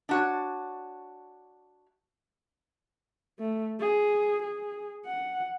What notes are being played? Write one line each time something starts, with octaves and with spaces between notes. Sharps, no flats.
D4 F#4 C#5
A3
G#4
G#4
F#5